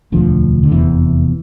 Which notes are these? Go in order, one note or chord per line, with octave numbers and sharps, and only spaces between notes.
E1 D2 D3 F3
D3
F1 E2 C3 E3